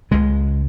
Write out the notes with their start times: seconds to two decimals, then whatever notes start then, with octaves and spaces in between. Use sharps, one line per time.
0.11 C#2 C#3 G#3